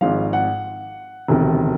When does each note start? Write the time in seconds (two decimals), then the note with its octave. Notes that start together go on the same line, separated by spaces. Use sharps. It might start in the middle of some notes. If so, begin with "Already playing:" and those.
0.01 G#1 G#2 F3 F5
0.33 F#5
1.28 E1 D2 C3 D#3